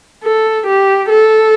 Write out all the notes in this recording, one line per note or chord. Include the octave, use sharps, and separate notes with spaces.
A4
G4
A4